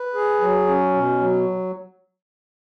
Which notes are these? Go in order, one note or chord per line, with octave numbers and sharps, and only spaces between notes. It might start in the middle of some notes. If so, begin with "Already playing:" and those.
Already playing: B4
G#4
F#3
C#4
B2
F#3